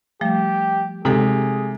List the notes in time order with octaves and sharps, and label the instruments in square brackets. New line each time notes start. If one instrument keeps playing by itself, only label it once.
[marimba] F3 G3 A3 [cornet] G4
[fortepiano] C3 [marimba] G#3 D#4 A4 [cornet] G#4